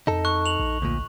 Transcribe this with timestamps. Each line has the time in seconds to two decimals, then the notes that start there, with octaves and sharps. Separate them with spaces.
0.07 F2 D#4 A4
0.25 C#6 F#6
0.46 F7 F#7
0.59 A#1
0.82 D2 A#2